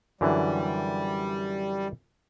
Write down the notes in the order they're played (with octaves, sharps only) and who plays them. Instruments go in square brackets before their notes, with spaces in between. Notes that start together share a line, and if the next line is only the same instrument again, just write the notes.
[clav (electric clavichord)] F#2 D3 E3 [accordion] G3